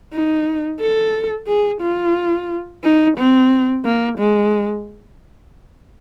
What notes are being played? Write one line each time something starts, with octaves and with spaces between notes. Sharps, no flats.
D#4
A4
G#4
F4
D#4
C4
A#3
G#3